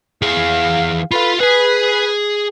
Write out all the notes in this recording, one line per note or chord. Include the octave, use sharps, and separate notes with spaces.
E3 G#4 F5
F4 A4 B4 F5 B5
G#4 B4 G#5